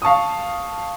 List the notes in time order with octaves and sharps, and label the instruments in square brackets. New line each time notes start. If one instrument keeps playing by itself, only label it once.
[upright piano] F5 A5 C#6 D#6